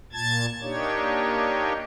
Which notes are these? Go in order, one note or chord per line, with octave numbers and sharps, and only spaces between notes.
A#2 A5 G#6 A6
A#3 D4 D#4 G4 C#5